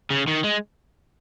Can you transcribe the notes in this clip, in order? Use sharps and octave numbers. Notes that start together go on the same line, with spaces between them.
C#3
D#3
G#3